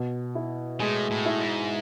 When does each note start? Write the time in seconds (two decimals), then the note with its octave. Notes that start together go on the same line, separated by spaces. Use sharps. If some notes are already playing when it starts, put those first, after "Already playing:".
Already playing: B2
0.35 E4
0.80 A2 G#3
1.11 A2
1.26 E4
1.41 G#2